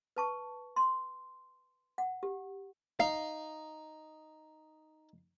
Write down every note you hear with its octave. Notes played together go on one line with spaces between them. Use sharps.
B4 A5 C#6
C6
F#5
G4
D#4 F5